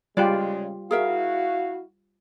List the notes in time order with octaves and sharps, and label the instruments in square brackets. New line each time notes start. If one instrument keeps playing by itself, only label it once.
[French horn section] C#3 G#3 [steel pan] G3 F4 G4 [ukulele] D5
[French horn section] E4 F#4 [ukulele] G#4 A#4 E5 [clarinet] F5